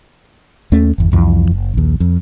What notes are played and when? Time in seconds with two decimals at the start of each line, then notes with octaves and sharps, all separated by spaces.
0.72 D#2 A3 C#4
0.98 G1 E2
1.12 C2 F2 E3
1.51 F#1
1.74 A#1 D#2
2.00 F2